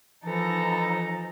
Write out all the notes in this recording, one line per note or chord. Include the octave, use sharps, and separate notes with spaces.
E3 F3 D#4 A4 A#5